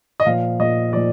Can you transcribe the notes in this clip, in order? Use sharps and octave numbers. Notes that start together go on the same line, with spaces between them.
D#5
A#2 F3 F5
A#2 F3 D#5
A#2 F3 D5